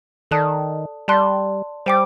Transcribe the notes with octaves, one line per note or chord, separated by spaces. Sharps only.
D#3 A4 D5 A5 D#6 F#6
G3 D5 A5 C6 F#6
G3 C5 G5 D6